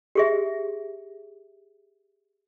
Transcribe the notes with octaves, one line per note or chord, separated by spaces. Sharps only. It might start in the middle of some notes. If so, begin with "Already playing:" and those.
G4 G#4 E5